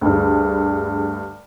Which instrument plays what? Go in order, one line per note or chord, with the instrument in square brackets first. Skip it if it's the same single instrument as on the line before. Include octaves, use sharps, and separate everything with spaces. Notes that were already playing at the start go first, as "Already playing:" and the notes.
[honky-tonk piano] D2 G2 [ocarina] G#4